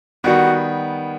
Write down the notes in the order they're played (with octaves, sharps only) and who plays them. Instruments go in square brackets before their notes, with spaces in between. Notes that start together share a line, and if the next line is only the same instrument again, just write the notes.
[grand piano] D#3 G3 B3 [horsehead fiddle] F#4